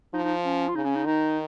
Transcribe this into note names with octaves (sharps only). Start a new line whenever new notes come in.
F3 D#4
D#4
C#4
F4
C#3 D#4
C#4
D#4
D#3 D#4